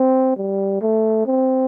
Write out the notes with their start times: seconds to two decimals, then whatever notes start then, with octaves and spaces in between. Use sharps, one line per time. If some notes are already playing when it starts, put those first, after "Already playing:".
Already playing: C4
0.37 G3
0.82 A3
1.26 C4